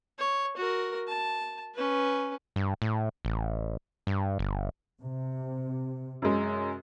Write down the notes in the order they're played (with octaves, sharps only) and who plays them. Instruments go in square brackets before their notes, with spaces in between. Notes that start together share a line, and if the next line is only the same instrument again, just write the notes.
[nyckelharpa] C#5
F#4 A#4
A5
C#4 B4
[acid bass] G2
A2
A1
G2
G1
[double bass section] C3
[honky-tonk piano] F#2 G#3